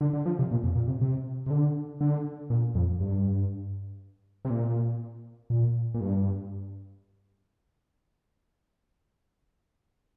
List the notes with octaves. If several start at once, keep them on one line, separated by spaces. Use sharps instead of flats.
D3
D3
F3
C3
A#2
F2
A#2
C3
C3
C3
D3
D3
A#2
F2
G2
C3
A#2
A#2
A#2
G2